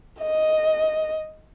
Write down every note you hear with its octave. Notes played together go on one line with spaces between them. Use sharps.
D#5